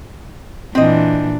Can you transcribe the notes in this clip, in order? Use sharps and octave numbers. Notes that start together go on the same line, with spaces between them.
A#2 E3 C4 D4 D#5